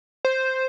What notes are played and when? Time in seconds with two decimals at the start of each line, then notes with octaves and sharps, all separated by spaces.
0.25 C5